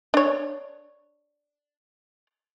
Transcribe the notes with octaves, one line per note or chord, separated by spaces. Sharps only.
D4 C#5